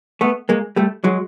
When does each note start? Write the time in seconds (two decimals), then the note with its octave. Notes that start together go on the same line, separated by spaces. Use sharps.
0.21 A3 B3
0.49 G#3 A#3
0.76 G3 A3
1.04 F#3 G#3